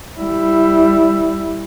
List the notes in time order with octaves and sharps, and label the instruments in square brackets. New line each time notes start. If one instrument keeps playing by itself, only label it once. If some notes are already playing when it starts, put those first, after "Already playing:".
[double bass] G3 E4